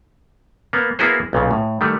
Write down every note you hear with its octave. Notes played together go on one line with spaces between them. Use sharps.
A#3 B3
A#3 B3 E4 F#4 G#4 C5
B1 A#2 C#3
A2
D#3 G3 A3